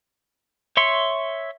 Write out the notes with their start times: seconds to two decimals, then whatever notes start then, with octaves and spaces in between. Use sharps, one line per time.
0.77 C#5 E5 C6 C#6